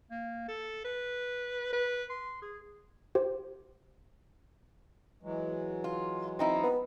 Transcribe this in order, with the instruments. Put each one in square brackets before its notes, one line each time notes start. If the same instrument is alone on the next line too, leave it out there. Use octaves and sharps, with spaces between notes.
[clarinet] A#3
A4
B4
B4
C6
G#4
[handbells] G4 C5
[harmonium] E3 F#3 G#3
[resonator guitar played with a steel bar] F4
C4 D#4 E4
[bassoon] B3